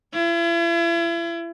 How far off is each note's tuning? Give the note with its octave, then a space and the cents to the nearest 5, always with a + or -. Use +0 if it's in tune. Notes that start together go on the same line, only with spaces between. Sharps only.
E4 +40